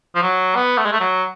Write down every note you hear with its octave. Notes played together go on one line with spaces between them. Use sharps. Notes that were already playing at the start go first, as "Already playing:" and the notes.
F3
F#3
B3
A3
G#3
A3
F#3